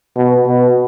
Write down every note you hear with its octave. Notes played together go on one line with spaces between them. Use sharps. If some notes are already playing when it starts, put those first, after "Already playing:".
B2
B2